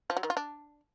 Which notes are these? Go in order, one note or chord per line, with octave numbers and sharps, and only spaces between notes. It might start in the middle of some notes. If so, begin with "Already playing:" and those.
F3
F#3
D#3
F4
D4